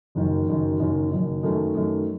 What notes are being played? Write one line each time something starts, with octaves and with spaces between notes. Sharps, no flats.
F#1 F#2 D#3
F#1 F#2 D#3
F#1 F#2 D#3
F#1 F#2 D#3
F#2 D#3 A3
F#2 D#3 A3